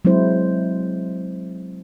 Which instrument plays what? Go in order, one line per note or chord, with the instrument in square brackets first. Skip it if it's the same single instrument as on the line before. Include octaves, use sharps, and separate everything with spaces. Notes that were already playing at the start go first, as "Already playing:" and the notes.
[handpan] F#3 G#3 C4 E4 C5